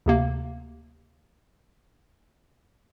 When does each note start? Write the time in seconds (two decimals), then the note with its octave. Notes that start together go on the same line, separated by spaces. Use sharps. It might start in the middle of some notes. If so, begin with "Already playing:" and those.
0.06 D2 C3 A#3